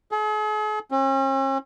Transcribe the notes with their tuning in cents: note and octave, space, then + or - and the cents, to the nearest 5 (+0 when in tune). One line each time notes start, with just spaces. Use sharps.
G#4 +45
C#4 -45